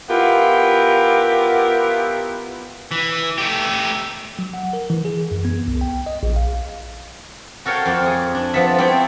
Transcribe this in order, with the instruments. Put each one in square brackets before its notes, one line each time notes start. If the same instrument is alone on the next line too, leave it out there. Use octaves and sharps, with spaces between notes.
[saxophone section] B3 E4 F4 G4 A#4
[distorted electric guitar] E3
A3 G4
[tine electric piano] F#3
F#5
A#4
E3
G#4
F#2
B3
C2
G5
D#5
A#1
F5
[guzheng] F#4 A4 A#4 C#5 F5 G5
F2 C5 D5
G#4
D4
F3 B3 A4 E5
C4 E4 C#5 D5 G5